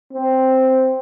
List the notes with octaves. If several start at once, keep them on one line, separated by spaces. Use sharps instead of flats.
C4